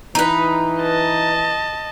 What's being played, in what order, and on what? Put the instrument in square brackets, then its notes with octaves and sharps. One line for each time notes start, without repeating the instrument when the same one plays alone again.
[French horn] E3 [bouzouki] D#4 B4
[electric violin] D#5 A5